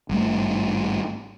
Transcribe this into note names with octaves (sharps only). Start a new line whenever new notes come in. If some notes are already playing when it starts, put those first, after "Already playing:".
G#1 G2 A3